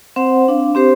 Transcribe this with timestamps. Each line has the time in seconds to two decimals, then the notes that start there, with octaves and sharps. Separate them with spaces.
0.16 C4 C5 F#5
0.48 D4 F5
0.75 C4 G4 C5